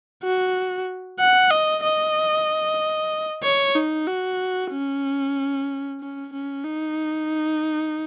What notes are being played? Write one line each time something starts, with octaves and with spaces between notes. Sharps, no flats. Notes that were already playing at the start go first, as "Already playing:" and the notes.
F#4
F#5
D#5
D#5
C#5
D#4
F#4
C#4
C#4
C#4
D#4